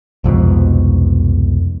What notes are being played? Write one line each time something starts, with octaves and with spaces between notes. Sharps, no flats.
C2 F2 G#2 B2